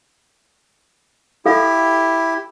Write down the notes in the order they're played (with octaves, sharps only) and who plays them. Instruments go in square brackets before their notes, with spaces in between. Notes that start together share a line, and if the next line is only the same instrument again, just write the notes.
[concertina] E4 G4 [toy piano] A4 F5